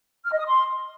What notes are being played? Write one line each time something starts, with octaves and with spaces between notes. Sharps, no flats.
F6
D#5
D#6
C6